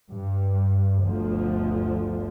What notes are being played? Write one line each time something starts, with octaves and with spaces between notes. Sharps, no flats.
G2
G1 D2 D3 F3